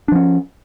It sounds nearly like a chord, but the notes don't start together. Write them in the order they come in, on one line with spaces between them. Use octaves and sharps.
D4 F3 C#4